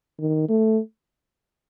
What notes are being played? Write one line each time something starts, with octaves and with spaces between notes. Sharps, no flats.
D#3
A3